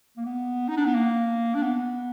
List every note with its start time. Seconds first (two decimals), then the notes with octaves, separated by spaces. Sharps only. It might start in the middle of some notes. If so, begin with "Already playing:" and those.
0.17 A#3
0.25 B3
0.68 D#4
0.77 D4
0.85 B3
0.94 A#3
1.54 D4
1.62 B3